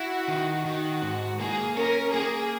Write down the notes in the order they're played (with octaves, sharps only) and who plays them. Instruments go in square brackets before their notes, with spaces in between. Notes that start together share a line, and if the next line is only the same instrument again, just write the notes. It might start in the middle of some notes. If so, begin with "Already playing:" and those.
Already playing: [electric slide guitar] E4 [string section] F#4
[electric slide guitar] D#3
[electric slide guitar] D#3 [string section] F#4
[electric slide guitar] G#2
[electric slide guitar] A#3 [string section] G#4
[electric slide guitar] C#4 [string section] A#4
[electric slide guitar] A#3 [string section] G#4